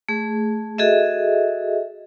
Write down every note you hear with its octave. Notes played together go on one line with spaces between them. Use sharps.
A3 G#4
F#4 G#4 A4 D#5 E5